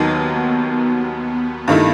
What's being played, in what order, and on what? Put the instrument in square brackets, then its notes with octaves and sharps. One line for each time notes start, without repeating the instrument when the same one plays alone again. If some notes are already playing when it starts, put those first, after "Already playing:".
Already playing: [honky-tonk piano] D#2 D#3 F#3 [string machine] B3
[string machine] B3
B3
[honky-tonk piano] G2 D#3 A3 E4